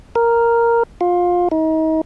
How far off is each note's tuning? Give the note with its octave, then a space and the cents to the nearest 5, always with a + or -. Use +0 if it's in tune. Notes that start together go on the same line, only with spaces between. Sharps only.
A#4 +0
F4 +20
D#4 +35